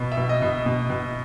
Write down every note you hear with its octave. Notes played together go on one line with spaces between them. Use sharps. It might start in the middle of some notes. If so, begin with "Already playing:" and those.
Already playing: B2
E5
B2
D#5
B2
B2
B2